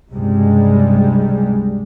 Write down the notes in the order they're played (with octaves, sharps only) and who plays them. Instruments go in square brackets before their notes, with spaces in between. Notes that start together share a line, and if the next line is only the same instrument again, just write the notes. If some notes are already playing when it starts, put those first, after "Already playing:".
[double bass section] C#2 G2 C3 G3 G#3